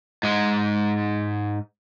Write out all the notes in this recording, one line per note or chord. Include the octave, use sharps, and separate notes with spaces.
G#2 G#3